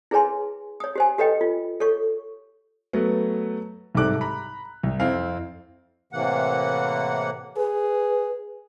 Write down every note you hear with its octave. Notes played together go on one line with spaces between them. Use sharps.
E4 G#4 B4 C#5 G#5 C6
C#5 D#6
G4 C5 G#5
G4 A4 B4 C#5 D#5 G5
F4
A4 C#5 C#6
F#3 A3 B3
C2 G#2 C3 A4 D6 F#6
A#5 B5
C2
F2 C4 E4 F5
A2 C3 E3 A#3 F#5
G#4 B4